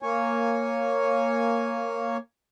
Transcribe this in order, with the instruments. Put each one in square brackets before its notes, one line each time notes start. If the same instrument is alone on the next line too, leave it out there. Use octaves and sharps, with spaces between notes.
[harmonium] A#3 C#5 G#5